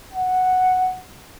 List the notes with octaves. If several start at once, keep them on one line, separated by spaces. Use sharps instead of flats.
F#5